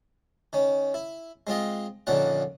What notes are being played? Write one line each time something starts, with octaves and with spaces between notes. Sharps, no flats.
D#3 C#4
E4
G#3 C4 F4 D#5
A#1 A#2 D3 D#3 C#4 F#5